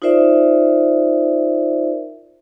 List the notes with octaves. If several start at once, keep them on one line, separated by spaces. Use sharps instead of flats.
D#4 F4 A#4 C5 D5 E5